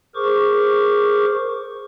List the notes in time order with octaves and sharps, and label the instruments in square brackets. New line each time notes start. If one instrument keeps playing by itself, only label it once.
[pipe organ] G#4 A#4 C5 C#6 D6